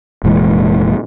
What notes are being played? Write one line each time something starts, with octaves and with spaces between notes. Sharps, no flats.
F1 A#2 E3 G#3